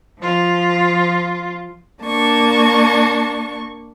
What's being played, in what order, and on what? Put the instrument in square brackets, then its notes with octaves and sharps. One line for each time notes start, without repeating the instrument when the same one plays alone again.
[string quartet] F3 F4
A#3 D4 C#6